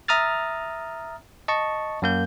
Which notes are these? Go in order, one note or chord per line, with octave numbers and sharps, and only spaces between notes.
E5 A#5 D#6 F6 A6
D#5 A5 C#6
F#2 A#3 G6